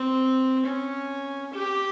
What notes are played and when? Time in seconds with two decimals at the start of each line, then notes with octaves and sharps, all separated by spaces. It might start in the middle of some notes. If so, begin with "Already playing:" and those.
Already playing: C4
0.65 C#4
1.53 G4